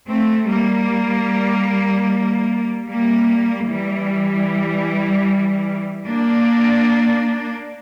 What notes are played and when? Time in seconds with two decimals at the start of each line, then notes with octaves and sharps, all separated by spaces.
0.09 A3 C4
0.49 G3 A#3
2.88 G3 A#3
3.67 E3 G3
6.06 A#3 D4